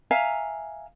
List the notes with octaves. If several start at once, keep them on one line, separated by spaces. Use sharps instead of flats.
E5 F5 G#5 A#5